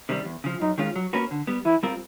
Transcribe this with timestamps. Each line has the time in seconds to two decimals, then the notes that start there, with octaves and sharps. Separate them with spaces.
0.09 C3 D#3 G3
0.25 E2
0.44 C#3 F3
0.61 F#2 D#4
0.78 D#3 G#3 C#4 F4
0.96 F#3
1.13 A#3 C#4 F#4 B4
1.31 D3
1.47 G3 B3
1.65 E3 E4
1.83 G3 C4 F4 A#4